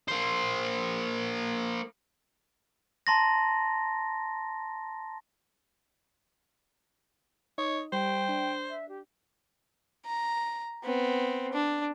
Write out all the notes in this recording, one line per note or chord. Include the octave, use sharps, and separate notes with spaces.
A#3 C5
A5 A#5 C6 A6 A#6
D#4 C#5 D#5
G3 C5 G5
D4
E5
G4
A#5
B3 C4
D4